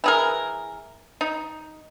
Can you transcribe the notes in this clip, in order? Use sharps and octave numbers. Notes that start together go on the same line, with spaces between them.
E3 G#4 A#4
D#4